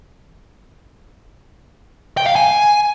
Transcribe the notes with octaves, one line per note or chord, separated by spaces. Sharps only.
G5
F5
G#5